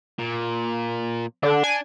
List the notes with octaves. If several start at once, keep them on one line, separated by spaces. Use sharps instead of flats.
A#2
D3 D4
G#5